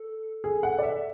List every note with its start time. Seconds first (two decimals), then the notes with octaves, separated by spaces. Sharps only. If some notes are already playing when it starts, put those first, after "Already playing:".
Already playing: A4
0.44 G#4 A4
0.63 F#5
0.79 D5
0.83 E5